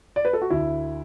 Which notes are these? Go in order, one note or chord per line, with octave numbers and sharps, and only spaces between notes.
D5
B4
A4
F#4
D2 D3 E4